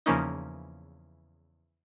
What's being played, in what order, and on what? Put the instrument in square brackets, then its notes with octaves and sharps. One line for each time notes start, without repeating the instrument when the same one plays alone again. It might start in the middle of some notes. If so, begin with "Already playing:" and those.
[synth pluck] E2 C#3 F3 A#3 C#4 D#4